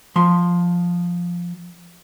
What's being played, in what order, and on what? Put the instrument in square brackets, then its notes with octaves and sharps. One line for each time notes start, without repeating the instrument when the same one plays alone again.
[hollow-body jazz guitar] F3 C6